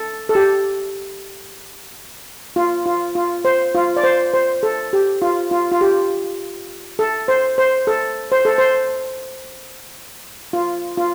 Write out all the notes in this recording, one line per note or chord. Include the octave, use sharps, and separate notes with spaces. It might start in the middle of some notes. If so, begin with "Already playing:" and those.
Already playing: A4
A4
G4
F4
F4
F4
C5
F4
D5
C5
C5
A4
G4
F4
F4
F4
G4
A4
C5
C5
A4
C5
A4
C5
F4
F4